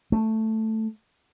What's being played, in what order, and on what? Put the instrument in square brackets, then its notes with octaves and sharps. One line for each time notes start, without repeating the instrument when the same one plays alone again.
[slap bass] A3